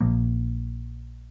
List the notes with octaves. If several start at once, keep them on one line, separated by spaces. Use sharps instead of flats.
A#1 A#2 F3 A#3